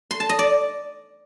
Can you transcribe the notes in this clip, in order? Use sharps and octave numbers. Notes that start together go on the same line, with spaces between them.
C6
A5
D#5
D5